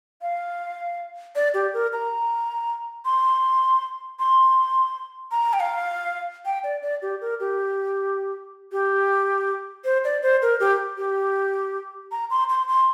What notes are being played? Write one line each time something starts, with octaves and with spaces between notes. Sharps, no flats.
F5
D5
G4
A#4
A#5
C6
C6
A#5
G5
F5
G5
D5
D5
G4
A#4
G4
G4
C5
D5
C5
A#4
G4
G4
A#5
C6
C6
C6